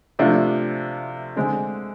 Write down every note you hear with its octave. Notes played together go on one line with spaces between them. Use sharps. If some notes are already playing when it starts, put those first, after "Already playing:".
C3 F3 A3 D4 F4
D3 G#3 C4